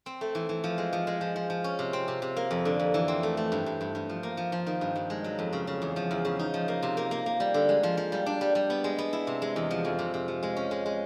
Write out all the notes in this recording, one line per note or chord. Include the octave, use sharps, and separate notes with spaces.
C4
A3
E3
E3
F3
G#3
F3
G#3
F3
F3
F3
C#4
C3
C4
C3
C3
A#3
F2
D3
F2
E3
C4
A3
A3
G2
G2
G2
G2
F3
A#3
F3
F3
D#3
G2
G2
G#3
F#3
F2
C#3
C#3
E2
F3
E2
C#3
D#4
F3
A#3
C3
A#3
A#3
A#3
G3
D3
G#3
F3
F3
G3
D4
G3
G3
B3
G#3
B3
E4
C3
G#3
E2
F3
F2
C3
C3
F3
G#3
C#4
G#3
G#3